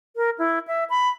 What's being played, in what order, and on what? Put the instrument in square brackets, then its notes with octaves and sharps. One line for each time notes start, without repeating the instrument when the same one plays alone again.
[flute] A#4
E4
E5
B5